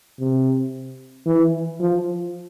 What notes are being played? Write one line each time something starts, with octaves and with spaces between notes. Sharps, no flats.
C3
E3
F3